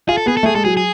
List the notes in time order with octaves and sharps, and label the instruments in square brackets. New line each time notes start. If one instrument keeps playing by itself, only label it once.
[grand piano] F4 [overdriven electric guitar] G#4
[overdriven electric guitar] A4
[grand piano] B3 [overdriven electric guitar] G#4
[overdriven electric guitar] A4
[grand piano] A3
[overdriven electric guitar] G#4
[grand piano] G#3 [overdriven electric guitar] A4
[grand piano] F#3 [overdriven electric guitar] G#4
[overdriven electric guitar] G#4